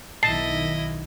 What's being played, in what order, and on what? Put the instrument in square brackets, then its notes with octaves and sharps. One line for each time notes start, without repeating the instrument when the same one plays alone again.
[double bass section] B1 D#3 [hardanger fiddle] E4 D#5 [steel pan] A5 [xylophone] C7